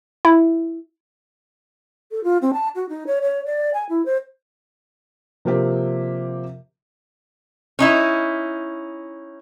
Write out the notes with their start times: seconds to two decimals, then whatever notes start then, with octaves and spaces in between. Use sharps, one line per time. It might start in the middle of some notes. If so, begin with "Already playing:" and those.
0.25 E4
2.11 A4
2.24 F4
2.42 C4
2.53 A5
2.75 F#4
2.89 D#4
3.07 C#5
3.22 C#5
3.46 D5
3.74 G#5
3.89 E4
4.06 C5
5.45 C3 F3 A#3 C4 G4
7.79 C#4 D#4 E4